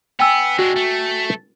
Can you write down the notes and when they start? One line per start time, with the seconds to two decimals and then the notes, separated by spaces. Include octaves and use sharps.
0.20 B3 G5 G#5 E6
0.59 G#3 D4 F#4
0.76 A3